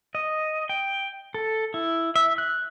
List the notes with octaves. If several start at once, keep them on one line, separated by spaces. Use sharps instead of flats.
D#5
G5
A4
E4
E5
F#6